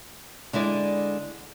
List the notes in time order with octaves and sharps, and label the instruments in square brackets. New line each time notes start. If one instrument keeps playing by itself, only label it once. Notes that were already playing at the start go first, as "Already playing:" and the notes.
[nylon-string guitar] D3 G#3 E4 D5